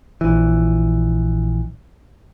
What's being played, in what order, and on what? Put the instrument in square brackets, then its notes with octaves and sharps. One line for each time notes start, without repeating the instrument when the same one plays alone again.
[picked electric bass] A#1 E3